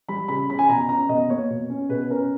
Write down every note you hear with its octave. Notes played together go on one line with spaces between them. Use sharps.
G3 B5
C#3 B5
C#4 B5
G#5
B2 A#5
C#4 A#5
B2 D#5
A#3 C#5
B2
C#4
B2 B4
C#4 A#4